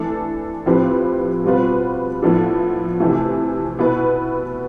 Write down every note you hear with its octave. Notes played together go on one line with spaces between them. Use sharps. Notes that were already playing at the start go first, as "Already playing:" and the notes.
Already playing: E3 A3 D4 A4
A2 F3 C4 G4 B4
B2 G3 C4 F4 B4
A2 F3 B3 D4 A4
C3 E3 A3
B2 B3 E4 B4